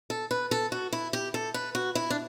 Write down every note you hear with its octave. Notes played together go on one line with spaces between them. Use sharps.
A4
B4
A4
F#4
E4
G4
A4
B4
F#4
E4
D4